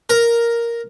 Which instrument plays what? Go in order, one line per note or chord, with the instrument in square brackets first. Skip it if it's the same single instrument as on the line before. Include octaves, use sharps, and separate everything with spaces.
[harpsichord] A#4